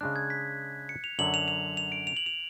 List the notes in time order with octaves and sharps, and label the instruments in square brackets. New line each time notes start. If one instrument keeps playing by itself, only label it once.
[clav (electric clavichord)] C#3 G#3 D4 [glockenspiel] F#6
[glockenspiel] G#6
B6
C#7
F7
[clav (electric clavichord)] F#2 D3 F#3 [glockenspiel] F#7
[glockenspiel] F7
F7
F7
D7
F7
F#7
F7